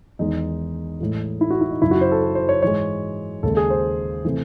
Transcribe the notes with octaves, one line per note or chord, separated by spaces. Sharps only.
E2 D#3 G#3 D#4
A2 E3 G#3
E4
F#4
E4
D#4
F#2 C#3 F#3 E4
F#4
C5
A4
A4
C5
C#5
G#2 E3 G#3 C#5
D#2 C#3 G#3 A4
G#4
C5
C3 E3 A3